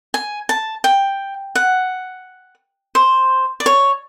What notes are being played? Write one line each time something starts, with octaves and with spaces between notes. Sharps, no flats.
G#5
A5
G5
F#5
C5
D5
C#5